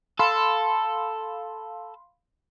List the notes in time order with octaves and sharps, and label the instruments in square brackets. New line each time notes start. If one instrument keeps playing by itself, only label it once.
[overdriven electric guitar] A4 [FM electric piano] F5 B5 C6